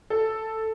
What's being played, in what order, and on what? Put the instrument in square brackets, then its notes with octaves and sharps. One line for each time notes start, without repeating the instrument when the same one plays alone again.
[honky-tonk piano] A4